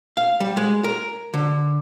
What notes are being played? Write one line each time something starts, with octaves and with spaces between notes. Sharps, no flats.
F5
G3
G#3
A#4
D3